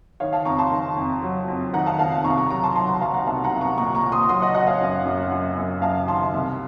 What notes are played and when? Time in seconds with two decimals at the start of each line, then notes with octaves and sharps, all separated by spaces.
0.20 D#3 C#5 F5
0.33 F5 A5
0.45 F2 A#5 C#6
0.59 A5 C6
0.72 D#3
0.97 F2
1.23 F#3
1.48 F2
1.73 D#3 F#5 A#5
1.86 F5 A5
1.99 D#3 F5 A5
2.25 C2 A#5 C#6
2.37 A#5 C#6
2.50 F#3 A#5 C#6
2.63 A5 C6
2.76 F#3 A5 C6
2.89 F#5 A#5
3.02 F#3 F5 A5
3.14 F#5 A#5
3.27 C2 F5 A5
3.44 F#5 A#5
3.52 C2
3.61 A#5 C#6
3.78 A#2 A#5 C#6
3.95 A#5 C#6
4.03 A#2
4.12 C6 D#6
4.29 F#3 C6 D#6
4.42 D#5 F#5
4.55 F#3 D#5 F#5
4.67 C#5 F5
4.80 F#2
5.06 F#2
5.32 F#2
5.58 F#2
5.82 F#2 F5 A5
6.08 D#3 A5 C6
6.33 C2